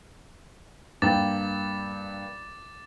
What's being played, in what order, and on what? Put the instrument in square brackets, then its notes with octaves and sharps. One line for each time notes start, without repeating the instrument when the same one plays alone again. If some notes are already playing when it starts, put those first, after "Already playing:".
[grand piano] G2 A#3 G5 [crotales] D6 A6